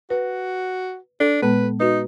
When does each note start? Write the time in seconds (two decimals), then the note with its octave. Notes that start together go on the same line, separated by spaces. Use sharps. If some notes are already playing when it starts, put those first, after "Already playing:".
0.10 F#4 B4
1.20 D4 A4
1.42 A#2 G#3 B3 B4
1.80 D#4 F#4 B4